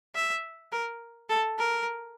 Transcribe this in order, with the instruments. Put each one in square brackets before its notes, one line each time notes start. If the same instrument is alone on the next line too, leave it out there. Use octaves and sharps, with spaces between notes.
[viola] E5
A#4
A4
A#4